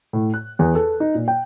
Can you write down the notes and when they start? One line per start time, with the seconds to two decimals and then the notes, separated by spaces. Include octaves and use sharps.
0.13 A2
0.34 F#6
0.59 E2
0.75 A4
1.00 D#4
1.15 A#2
1.28 G5